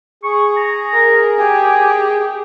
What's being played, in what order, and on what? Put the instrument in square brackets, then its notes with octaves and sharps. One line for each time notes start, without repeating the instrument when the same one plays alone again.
[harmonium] G#4 [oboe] C#6
[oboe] A#5
[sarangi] A#4
[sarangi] G4 [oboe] G#5